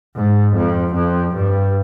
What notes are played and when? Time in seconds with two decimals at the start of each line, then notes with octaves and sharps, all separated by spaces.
0.16 G#2
0.55 F2
0.95 F2
1.35 G2